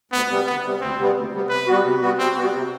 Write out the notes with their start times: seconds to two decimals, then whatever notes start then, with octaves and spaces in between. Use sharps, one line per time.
0.12 D2 B3
0.30 C3 G3 B3
0.46 D2 B3
0.64 C3 G3 B3
0.80 D2 C4
0.98 C3 G3 B3
1.15 D2
1.32 C3 G3 B3
1.49 C3 B4
1.67 G3 B3 F#4
1.84 C3
2.01 G3 B3 F#4
2.18 C3 C4
2.36 G3 B3 F#4
2.53 C3